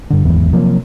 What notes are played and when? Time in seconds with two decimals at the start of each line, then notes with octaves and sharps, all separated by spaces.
0.10 G2 D3
0.25 D1 G#1 E2 E3
0.53 C3 F3 F#3 A#3